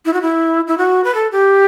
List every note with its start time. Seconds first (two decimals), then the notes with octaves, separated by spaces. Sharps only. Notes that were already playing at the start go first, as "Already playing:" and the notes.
0.05 E4
0.13 F#4
0.22 E4
0.67 E4
0.78 F#4
1.04 B4
1.15 A4
1.32 G4